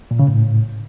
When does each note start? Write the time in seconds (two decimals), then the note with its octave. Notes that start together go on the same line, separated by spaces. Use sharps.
0.11 A#2
0.19 C#3
0.28 A2